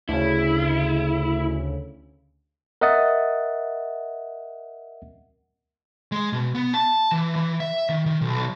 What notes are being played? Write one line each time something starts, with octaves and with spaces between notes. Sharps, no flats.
D2 C#3 E4
A#4 D#5 E5 F#5 D#6 A6
G#3
B2
B3
A5
E3
E3
E5
D#3
D#3
B1